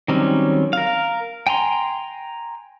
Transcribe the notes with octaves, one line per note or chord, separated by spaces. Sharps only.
D#3 F#3 G3 C4 C#4
A#4 F5
G5 G#5 A#5 C6